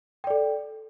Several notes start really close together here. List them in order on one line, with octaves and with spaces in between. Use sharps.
G5 D5 A4